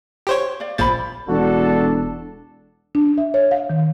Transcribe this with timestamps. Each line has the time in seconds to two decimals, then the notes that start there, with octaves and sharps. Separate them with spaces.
0.27 G4 C5 C#5
0.60 D5 F5
0.78 A#1 A#2 C5 B5 A6
1.29 E1 D4 F#4 A4 A5
2.95 D4
3.18 E5
3.34 C#5
3.51 F5
3.70 D#3